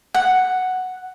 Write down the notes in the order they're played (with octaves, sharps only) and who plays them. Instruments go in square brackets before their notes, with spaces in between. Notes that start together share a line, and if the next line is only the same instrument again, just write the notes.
[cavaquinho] F#5